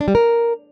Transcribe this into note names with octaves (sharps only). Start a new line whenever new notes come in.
D4
G3
A#4